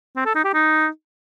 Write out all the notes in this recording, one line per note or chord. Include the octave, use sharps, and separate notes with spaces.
C4
A4
D#4
G4
D#4